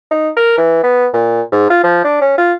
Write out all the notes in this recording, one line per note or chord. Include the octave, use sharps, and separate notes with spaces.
D#4
A#4
E3
B3
A#2
G#2
F4
F3
D4
C#4
F4